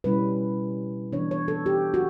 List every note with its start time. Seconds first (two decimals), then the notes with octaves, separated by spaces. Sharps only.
0.04 B2 G3 C#4 E4 B4
1.12 E3 B3 D4 C#5
1.31 C#5
1.48 A4
1.66 G4
1.94 F#4